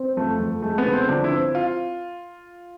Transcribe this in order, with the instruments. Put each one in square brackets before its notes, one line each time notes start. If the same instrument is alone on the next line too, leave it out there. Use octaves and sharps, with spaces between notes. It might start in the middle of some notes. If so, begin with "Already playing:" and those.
Already playing: [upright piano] C4
[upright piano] F2 [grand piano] A3
[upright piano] F2
[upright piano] G#3 [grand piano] A3
[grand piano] B3
[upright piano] D3
[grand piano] C4
[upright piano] F3 [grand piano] D4
[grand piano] E4
[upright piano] C4
[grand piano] F4